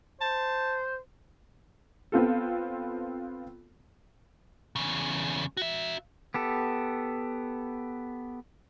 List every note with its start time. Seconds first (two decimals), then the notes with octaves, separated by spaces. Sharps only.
0.21 C5 A5
2.12 B3 C4 F4 A4
4.76 E2 C#3
5.57 F#4 E5
6.34 B3 G4 A4